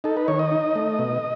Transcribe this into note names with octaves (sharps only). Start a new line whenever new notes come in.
D#4 A4
B4
D#3 C#5
D#5
D#4
A3
B2